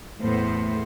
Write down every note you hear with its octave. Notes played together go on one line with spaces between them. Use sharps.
E2 A2 A3 B3 C5